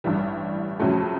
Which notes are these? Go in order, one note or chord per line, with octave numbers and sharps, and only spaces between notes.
A1 G2 E3 G3
F2 C#3 F#3 A3